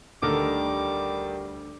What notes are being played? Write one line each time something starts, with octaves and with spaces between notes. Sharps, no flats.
D2 D#3 G3 A4 A#4 D6